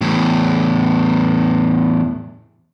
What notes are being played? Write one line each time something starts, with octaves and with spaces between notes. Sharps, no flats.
E2 A2